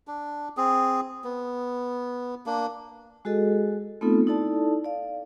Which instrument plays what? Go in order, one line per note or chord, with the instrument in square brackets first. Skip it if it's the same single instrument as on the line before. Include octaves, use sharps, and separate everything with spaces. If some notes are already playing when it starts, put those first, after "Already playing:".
[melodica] D4
C4 G#4
B3
A#3 D4
[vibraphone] G#3 F#4 G#4 A4 D#5
A3 B3 C4 D#4 F4 A4
D#4 E4 A4 D5 A5
D5 F5